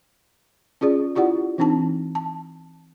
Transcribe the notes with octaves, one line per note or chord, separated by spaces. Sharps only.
C#4 F4 G#4 D5
E4 F4 G4 D5 F#5
E3 C4 D4 D#4 A5
A5